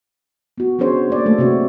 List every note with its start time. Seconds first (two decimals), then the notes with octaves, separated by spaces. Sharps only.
0.58 B3 F#4
0.79 B3 C#4 D4 G#4 C5 C#5
1.10 A#3 D5
1.26 A3 A4
1.38 C3 C4 F#4 C#5